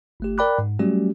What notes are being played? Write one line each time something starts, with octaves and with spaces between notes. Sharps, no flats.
G1 A3 G4
A#4 D5 G5 B5 D6 F#6
G#2
F#3 G3 A3 C#4 F#4 G4